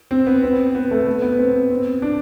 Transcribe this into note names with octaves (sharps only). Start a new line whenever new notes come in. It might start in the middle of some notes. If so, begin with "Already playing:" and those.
C4
B3
C4
B3
A3
B3
B3
C4
C4
D4